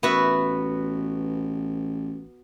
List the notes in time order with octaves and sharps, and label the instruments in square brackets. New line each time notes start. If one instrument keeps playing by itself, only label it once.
[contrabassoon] A1 [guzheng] B3 F#4 E5